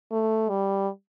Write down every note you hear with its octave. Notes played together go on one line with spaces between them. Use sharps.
A3
G3